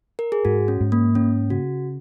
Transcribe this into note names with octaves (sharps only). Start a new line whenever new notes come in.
A#4
G#4
G#2 F#4
C#4
G#2
A#3
A#3 C#4
C#3 F#4